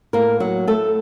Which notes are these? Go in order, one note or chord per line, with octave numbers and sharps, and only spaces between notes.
A2 A#3 A#4
F#3 F#4
A3 A4